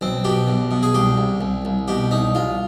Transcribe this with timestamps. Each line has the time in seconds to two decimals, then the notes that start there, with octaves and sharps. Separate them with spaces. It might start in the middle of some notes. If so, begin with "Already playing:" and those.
0.01 B1 C4
0.25 B2 G4
0.48 B1
0.71 B2
0.83 G#4
0.94 C2 G4
1.17 C2
1.41 C2
1.65 C2
1.88 B2 G4
2.11 C2 D#4
2.35 C2 F4